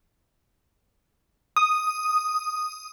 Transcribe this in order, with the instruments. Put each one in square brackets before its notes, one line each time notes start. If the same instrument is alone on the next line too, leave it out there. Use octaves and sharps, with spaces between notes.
[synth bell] D#6